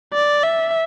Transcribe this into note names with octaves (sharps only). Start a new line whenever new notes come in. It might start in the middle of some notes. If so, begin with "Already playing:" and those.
D5
E5